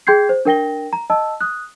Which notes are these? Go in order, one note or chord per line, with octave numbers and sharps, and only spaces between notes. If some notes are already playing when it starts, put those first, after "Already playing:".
G#4 G5 C6 G6 G#6 C7
C5
D4 A#4 G5 A#6 G7
A#5
D#5 A5 E6
D#6 F#6